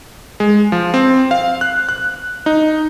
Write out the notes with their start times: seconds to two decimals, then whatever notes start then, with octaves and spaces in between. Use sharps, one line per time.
0.40 G#3
0.72 F3
0.94 C4
1.31 F5
1.61 F#6
1.89 F#6
2.46 D#4